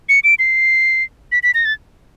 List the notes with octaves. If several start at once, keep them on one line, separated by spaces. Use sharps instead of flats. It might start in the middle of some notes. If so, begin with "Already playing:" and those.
C#7
D7
C7
B6
B6
A#6
A6